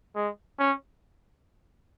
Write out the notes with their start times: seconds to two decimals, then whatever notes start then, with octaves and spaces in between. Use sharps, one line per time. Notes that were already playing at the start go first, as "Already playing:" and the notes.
0.16 G#3
0.59 C#4